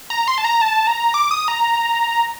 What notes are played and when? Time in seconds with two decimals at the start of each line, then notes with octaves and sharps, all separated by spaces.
0.10 A#5
0.28 C6
0.38 A5
0.45 A#5
0.61 A5
0.87 A#5
1.14 D6
1.31 D#6
1.48 A#5